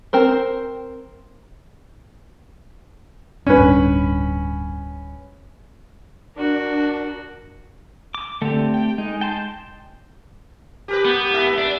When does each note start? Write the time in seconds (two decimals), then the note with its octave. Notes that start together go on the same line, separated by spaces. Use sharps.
0.13 C4 A#4 C5
3.47 D1 G2 C#4 D4 B4
6.36 D4 F#4 A#4
8.15 D6
8.42 D3 A3 C4 G4
8.74 G5
8.98 G#3 D#4
9.21 G5 A5 C6
10.88 G4 A#4 B4
11.05 B3
11.30 G#2 A#4 E5
11.58 D4